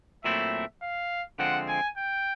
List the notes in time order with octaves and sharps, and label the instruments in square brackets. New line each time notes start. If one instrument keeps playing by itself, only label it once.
[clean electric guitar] A#2 F#3 A3 C4 E4 [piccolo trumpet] E5
[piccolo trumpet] F5
[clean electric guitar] D3 F3 G#3 C4 [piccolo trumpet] F#5
[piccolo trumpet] G#5
G5